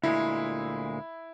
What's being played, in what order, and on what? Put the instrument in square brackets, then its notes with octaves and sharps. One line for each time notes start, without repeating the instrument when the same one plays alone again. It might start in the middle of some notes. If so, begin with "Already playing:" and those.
[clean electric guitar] D2 A#2 G#3 [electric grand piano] E4